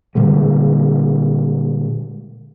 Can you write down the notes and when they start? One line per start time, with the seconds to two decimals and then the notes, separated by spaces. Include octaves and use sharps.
0.15 A#2 D3 G3 G#3